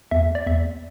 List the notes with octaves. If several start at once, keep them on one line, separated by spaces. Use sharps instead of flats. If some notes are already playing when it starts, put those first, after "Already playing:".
E2 E5
D5
E2 E5